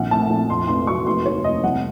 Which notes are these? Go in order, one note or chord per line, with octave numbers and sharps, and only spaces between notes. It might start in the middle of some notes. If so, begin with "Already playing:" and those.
Already playing: A#1 D#3 F#5
A3 A5
A#1
F2 C6
F1 C6
F#3 C#6
F1 C6
D#2 C#5
F1 D#5
C2 F#5